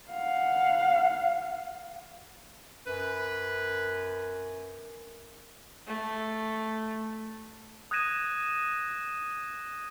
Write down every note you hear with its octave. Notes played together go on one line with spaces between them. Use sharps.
F5 F#5
F#2 B4
A3
D#6 F#6 G#6 A#6 D#7 E7